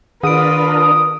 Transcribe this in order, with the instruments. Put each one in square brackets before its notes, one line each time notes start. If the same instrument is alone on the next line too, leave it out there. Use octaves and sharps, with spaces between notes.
[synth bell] D#3 D7 [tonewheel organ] D4 A#4 [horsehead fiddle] F4 B4 [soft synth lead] D#6